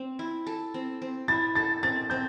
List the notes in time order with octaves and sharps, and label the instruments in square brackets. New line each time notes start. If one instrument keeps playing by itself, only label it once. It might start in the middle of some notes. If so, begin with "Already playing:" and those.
Already playing: [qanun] C4
E4
A4
C4
C4
[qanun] E4 [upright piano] A6
[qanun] A4 [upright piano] A6
[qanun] C4 [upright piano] A6
[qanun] C4 [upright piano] G6